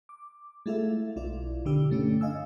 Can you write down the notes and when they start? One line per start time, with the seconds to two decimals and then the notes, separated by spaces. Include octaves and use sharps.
0.09 D6
0.66 G#3 A3 E4 F4 A4 E5
1.16 B1 E4 F4 D5
1.65 B2 D3 D4 G4 E6
1.90 G2 A3 C#4 D4
2.21 D#5 F5 G#5 E6